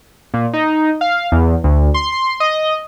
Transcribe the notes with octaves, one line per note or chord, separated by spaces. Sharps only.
A#2
D#4
F5
E2
D2
C6
C6
D#5